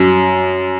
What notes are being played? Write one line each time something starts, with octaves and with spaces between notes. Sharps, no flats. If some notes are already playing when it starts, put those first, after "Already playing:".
Already playing: F#2